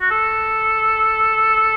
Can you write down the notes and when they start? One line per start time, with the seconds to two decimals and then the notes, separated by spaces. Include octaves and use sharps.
0.01 F#4
0.11 A4